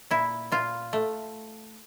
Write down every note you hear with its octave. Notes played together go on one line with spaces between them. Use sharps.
A#2 E4
A#2 F4
A3